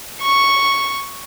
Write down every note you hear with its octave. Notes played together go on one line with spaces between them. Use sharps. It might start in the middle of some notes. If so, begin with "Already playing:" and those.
C#6